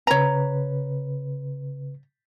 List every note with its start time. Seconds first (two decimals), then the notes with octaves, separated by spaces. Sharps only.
0.07 C#3 B4 C#5 A#5